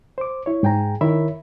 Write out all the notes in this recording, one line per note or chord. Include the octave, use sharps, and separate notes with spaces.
C5 D6
E4 C#5
G#2 G#4 G5 G#5 A#5
D#3 E4 A#4 C#5 E5 B5